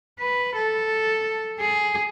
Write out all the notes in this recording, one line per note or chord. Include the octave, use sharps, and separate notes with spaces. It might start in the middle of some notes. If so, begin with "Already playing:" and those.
B4
A4
G#4